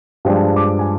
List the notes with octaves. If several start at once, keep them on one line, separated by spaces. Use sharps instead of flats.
G2 F3 G#3 D4 G5
D6
G#5